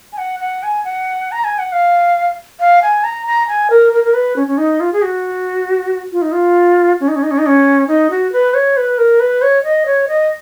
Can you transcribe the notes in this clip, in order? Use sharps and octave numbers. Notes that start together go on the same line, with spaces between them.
G#5
F#5
F#5
G#5
F#5
A#5
G#5
F#5
F5
F5
G#5
A#5
A#5
G#5
A#4
A#4
A#4
B4
C#4
C#4
D#4
F4
G#4
F#4
F4
D#4
F4
C#4
D#4
C#4
D#4
C#4
D#4
C#4
D#4
F#4
B4
C#5
B4
A#4
B4
C#5
D#5
C#5
D#5